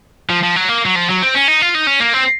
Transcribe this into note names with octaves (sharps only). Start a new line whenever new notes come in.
F3
F3
F#3
A#3
F#3
F3
F#3
C4
C#4
D#4
F4
D#4
C#4
A#3
C4